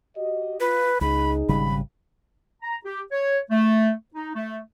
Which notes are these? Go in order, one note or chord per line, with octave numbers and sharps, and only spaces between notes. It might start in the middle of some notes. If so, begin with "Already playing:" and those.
F#4 G4 D#5
F4 B4
C#2 D#4 G#4 B5
G#1 C#3 G3 B5
A#5
G4
C#5
A3
D#4
A3